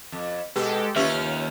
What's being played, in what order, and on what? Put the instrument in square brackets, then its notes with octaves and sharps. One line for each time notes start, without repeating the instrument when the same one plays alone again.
[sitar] F2
[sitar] B2 [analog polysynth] G#3 G4 A4 [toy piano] B4
[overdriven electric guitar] D#2 [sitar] C#4 F4 [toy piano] G4 B4 E5 [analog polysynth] F6